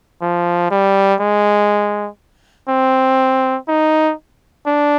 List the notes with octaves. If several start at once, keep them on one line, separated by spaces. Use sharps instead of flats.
F3
G3
G#3
C4
D#4
D4